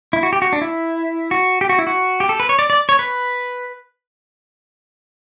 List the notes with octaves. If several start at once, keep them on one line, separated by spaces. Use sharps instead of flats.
E4
F#4
G4
F#4
D4
E4
F#4
G4
F#4
E4
F#4
G4
A4
B4
C#5
D5
D5
C#5
B4